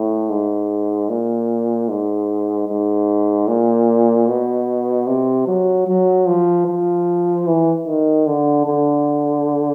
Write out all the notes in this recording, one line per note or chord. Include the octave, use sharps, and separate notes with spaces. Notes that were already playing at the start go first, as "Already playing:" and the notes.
Already playing: A2
G#2
A#2
G#2
G#2
A#2
B2
C3
F#3
F#3
F3
F3
E3
D#3
D3
D3